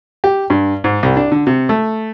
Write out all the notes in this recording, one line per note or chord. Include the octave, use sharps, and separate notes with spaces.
G4
G2
G#2
C2
D4
D3
C3
A3